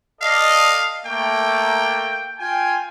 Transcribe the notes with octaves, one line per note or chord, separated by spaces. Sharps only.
A4 D5 D#5 F5
A3 A#3 G5
F4 G5 G#5